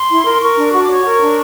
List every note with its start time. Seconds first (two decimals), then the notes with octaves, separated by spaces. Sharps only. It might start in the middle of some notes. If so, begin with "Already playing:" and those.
Already playing: C6
0.09 E4
0.25 A#4
0.41 A#4 C#6
0.57 D4
0.73 F#4 C#6
0.82 D6
0.89 C#5 C#6
1.05 A#4
1.21 D4